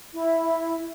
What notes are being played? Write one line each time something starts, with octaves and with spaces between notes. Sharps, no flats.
E4